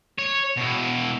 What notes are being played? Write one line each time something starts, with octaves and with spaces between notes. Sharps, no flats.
C#5
B2 E4